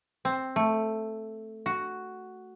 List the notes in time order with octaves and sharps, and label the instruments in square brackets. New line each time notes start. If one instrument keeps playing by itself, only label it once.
[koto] C4
A3
F#4